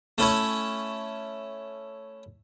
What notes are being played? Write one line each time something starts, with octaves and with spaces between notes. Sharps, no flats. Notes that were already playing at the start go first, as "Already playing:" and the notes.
A3 C#4 E4 C#5